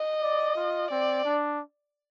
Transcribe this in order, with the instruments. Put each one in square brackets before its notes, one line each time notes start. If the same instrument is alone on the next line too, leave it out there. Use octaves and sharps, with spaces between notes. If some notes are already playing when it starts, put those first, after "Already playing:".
Already playing: [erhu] D#5
[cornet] D5
F4
[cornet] C4 [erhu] D5
[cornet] D4